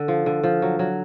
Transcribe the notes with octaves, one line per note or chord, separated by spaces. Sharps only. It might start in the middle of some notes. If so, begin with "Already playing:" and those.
Already playing: D3
F3
D3
F3
F#3
F#3